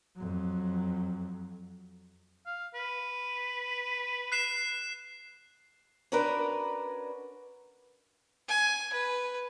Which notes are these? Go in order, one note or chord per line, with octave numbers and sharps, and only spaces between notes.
F2 F#3
F5
B4
F#6 C7 E7
C#4 D4 F#4 A#4 B4 D5
G#5
B4